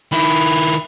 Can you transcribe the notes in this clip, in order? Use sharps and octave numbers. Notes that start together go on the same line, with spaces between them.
D#3 E4 B5